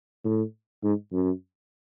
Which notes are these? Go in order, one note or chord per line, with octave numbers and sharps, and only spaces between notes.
A2
G#2
F#2